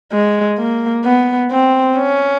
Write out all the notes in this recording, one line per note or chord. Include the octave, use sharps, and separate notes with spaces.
G#3
A#3
B3
C4
C#4